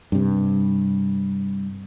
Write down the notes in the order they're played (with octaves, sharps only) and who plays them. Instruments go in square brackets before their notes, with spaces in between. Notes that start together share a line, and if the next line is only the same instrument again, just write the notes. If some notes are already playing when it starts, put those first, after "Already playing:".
[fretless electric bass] G2 C3